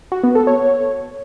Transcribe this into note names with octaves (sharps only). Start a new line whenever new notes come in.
F#4
B3
A4
C#5